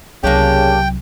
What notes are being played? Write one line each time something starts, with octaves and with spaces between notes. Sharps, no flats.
C2 C#3 F#3 A#3 D4 G4 G5